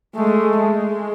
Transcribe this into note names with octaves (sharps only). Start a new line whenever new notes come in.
G#3 A3
G#3